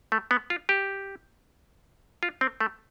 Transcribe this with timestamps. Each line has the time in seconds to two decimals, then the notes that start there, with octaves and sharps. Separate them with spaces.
0.12 A3
0.31 B3
0.50 F4
0.69 G4
2.23 F4
2.41 C4
2.60 A3